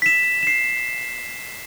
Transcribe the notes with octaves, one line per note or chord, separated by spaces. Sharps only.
B6 E7
C7 E7